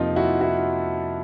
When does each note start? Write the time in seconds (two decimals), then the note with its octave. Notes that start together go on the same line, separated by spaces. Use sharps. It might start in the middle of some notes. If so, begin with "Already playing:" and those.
Already playing: F2 C3 F3 A#3 D#4 F4
0.16 E4 F#4
0.41 E4 F#4